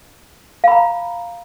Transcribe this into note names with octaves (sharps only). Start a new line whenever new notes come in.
F5 A#5 B5